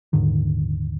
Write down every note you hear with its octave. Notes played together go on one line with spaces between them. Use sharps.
D#1 G#2 D3 D#3